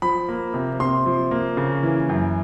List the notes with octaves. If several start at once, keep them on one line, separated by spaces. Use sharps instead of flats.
F3 B5
A#3
C3
C3 C6
F3
A#3
C#3
E3
F#2